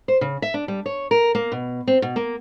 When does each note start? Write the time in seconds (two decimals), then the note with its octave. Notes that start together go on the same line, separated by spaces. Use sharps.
0.08 C5
0.21 C#3
0.42 E5
0.54 D4
0.68 G3
0.86 C#5
1.11 A#4
1.35 A#3
1.52 B2
1.87 C4
2.02 B2
2.16 A#3